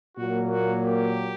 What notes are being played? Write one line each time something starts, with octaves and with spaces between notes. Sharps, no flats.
A#2 F#3 A#3 F#4
F#4
G4